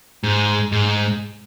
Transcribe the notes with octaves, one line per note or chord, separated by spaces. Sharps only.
G#2
G#2